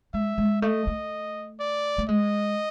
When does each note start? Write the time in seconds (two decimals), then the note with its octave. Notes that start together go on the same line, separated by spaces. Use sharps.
0.14 G#3 E5
0.38 G#3
0.62 A3 D#5
0.87 A3
1.60 D5
1.98 A3
2.09 G#3 D#5